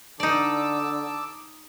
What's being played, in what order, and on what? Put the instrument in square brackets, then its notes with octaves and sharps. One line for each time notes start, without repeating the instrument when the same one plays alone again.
[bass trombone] D3 [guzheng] D#4 D5 [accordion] A5 D6 E6